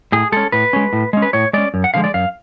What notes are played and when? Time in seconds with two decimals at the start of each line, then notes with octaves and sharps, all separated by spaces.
0.12 A2 G#4
0.32 G#3 C#4 A4
0.52 A2 B4
0.73 G#3 C#4
0.93 A2
1.13 G#3 C#4
1.22 B4
1.33 A2 C#5
1.53 G#3 C#4 D5
1.74 F#2
1.84 F#5
1.94 D3 F3 G#3 F5
2.04 D5
2.14 F#2 F5